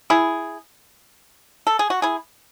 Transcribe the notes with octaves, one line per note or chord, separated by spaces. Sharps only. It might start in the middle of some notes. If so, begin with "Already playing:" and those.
E4 G#4
A4
G#4
F#4
E4 G#4